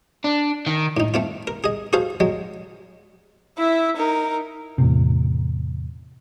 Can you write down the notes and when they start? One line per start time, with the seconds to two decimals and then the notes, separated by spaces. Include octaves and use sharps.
0.24 D4
0.66 D#3
0.97 A2 D#4
1.14 A3 C4 F4
1.47 A#4
1.64 G#4 D#5
1.93 F#4 G#4 A4 C5 F5
2.20 F#3 G#3
3.58 E4 E5
3.96 D#4 A#4
4.78 E2 A2 C3